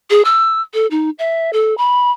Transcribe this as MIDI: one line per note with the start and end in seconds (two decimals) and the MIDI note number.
0.10 0.22 68
0.25 0.61 88
0.74 0.87 69
0.91 1.10 63
1.19 1.51 76
1.53 1.76 69
1.78 2.11 83